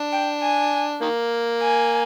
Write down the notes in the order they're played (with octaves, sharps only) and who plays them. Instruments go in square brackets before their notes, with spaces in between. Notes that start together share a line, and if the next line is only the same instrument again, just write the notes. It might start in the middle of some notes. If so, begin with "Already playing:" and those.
Already playing: [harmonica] D4
[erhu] G5
G#5
[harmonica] D#3 A#3
[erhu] G#5